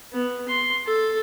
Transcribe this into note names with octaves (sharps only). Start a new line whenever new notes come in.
B3
C6
A4